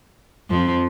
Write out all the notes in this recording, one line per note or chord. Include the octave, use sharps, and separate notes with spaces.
F2 F3